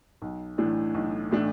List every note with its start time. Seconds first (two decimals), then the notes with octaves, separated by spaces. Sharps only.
0.22 B1
0.58 A2 E3 A3 D4
0.95 B1
1.31 A2 E3 A3 D4